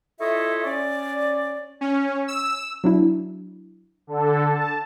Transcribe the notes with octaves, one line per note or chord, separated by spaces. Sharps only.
E4 F4 A4 C#5 D#5 E5
C#4 D5
C#4
E6
F#3 D4 E4
D3 A4
A5